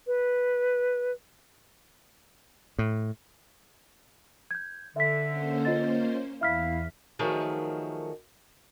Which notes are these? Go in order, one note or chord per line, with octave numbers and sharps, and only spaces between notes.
B4
A2
G6 G#6
D3 E5 B6
A#3 C#4 C5
F4 D#5 A6
E2 E4 E5 F5 F6 B6
D#3 F3 F#3 A3 G#4 A#4